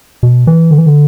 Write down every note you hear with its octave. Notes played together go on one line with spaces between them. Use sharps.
B2
E3
D3
E3
D3